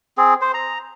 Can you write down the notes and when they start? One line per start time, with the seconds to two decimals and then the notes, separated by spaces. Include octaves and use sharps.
0.18 C4 G#4
0.41 C5
0.54 A#5